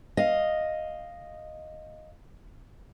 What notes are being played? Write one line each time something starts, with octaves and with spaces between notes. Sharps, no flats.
D#5 F5